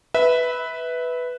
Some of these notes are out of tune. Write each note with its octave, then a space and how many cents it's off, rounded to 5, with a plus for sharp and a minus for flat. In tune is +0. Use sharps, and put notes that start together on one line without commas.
B4 +0 E5 -20